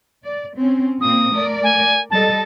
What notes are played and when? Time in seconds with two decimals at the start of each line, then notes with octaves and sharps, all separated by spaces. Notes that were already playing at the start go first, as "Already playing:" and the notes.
0.24 D5
0.56 C4 C#4
1.01 A#2 A#3 C4 D#6
1.33 A3 A#4 D5
1.63 G#5
2.11 G3 A4 D#5 A5